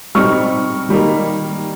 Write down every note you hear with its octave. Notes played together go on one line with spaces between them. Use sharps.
G3 C4 D#4 C#6 F6
D#3 G3 A#3 D#4